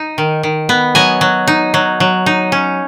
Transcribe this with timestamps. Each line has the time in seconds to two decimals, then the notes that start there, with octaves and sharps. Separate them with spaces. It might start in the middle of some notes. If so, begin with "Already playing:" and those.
Already playing: D#4
0.18 D#3
0.43 D#3
0.69 B3
0.95 F#3 D#5 G#5
1.21 F#3
1.47 D#4
1.74 F#3
2.00 F#3
2.26 D#4
2.52 C#4